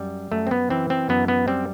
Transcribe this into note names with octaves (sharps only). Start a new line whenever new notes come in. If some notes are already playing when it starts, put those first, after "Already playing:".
Already playing: F#2 G3
F#2 A3
C4
B3
E3 C4
C4
F#2 B3
B3
G3 C4